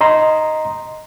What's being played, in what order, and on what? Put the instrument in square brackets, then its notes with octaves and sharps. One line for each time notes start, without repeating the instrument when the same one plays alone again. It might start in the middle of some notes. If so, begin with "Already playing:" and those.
[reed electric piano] D#5 A#5 C6